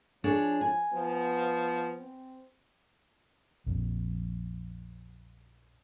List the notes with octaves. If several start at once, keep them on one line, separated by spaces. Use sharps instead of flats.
F3 D4 G#4 C#5
G#5
F3 B3
C4
A#1 F2